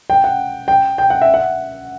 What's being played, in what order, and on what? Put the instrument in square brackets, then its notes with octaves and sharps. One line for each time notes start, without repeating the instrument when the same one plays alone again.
[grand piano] G5
F#5
G5
G5
F#5
E5
F#5